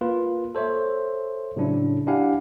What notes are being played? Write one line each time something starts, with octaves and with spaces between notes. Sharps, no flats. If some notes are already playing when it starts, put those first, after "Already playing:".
A#3 F4 B4
A4 C5 C#5 E5
A2 C#3 F#3 D4 E4
D4 E4 G4 F5 F#5 G#5